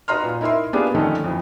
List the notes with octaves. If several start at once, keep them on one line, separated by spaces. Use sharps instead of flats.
F#4 B4 D#5 A#5 C6 F6
A#2
D#4 E4 A#4 E5 C6
A#3 B3 D4 F4 G4 G#4
F2 D3 D#3 A3 C#4 D#4
F2 E3